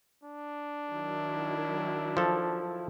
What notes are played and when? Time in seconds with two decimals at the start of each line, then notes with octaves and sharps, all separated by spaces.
0.23 D4
0.89 D#3 F#3 E4
2.17 F3 A4